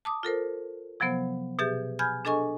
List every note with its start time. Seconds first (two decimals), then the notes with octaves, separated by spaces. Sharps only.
0.05 A5 D6 D#6
0.23 F4 A4 A#4 C5
1.00 C3 F3 F#3 B3 C5
1.59 B2 G4 G#4 E5 G6 A6
1.99 G#5 B5 F6 G6 G#6
2.25 D4 G#4 A4 D#5 G#5 C#6